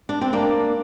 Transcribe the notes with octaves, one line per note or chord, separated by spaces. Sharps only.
D4
C4
A#3 D4